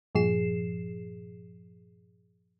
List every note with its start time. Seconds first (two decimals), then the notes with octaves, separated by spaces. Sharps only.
0.15 G2 A#2 F3 G#4 C7 E7